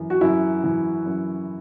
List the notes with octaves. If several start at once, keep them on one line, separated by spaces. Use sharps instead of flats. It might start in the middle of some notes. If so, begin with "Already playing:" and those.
Already playing: F#2 E3
F#4
F#2 E4
E3
F#2